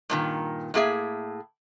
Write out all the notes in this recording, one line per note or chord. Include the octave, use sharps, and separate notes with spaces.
G2 A#2 D#3
A2 A#3 G#4 E5